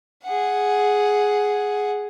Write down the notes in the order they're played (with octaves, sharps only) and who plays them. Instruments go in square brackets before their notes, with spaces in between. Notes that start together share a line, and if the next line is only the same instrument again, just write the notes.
[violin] G#4 F#5